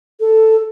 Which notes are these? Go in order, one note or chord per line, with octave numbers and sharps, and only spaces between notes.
A4